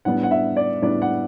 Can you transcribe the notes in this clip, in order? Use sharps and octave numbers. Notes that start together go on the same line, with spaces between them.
A2 G3 B3 D4 F#5
F#5
E5
D5
A2 G3 B3 D4 D5
F#5